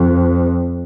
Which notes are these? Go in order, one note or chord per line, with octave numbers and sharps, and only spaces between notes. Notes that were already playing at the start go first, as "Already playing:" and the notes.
Already playing: F2